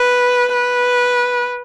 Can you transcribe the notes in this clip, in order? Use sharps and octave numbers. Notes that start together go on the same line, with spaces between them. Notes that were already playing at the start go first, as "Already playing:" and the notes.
Already playing: B4
B4